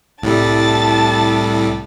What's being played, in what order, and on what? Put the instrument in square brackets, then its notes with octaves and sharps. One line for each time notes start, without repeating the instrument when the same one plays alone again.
[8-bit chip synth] C2 A2 G3 [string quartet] A5 A6